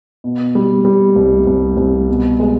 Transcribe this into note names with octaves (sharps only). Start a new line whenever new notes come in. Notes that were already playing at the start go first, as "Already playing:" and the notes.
B2
G3
G3
C2
C2
C2
B2
G#3